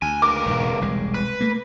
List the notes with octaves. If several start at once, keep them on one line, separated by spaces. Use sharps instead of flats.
D2 G#5
C#2 A#4 D6
E1 G#2 B2
E1 C2 G#3
B4
A3 A#3